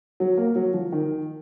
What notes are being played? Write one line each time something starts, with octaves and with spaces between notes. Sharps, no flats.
F#3
A#3
F#3
F3
D#3